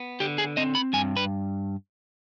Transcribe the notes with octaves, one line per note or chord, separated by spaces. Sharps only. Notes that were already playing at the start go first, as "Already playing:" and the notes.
Already playing: B3
D3 G4
G#4
C4 D#5
B5
G2 G#5
B4